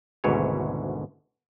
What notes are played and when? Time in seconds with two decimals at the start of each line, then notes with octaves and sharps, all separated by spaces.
0.24 G#1 D2 G#2 B2 E3 C#5